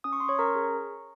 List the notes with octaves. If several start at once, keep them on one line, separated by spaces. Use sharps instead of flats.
C#4 D#6
C#6
C#4 C6
C#5 C#6
C#4 A#4 A#5
G#4